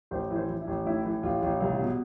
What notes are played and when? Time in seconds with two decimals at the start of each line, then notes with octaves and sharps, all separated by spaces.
0.11 A1 C5
0.30 E3
0.36 C5
0.49 E3
0.61 E4
0.67 A1
0.85 A2 E4
1.05 E3
1.23 A1 F4
1.42 A1
1.60 C2
1.80 B2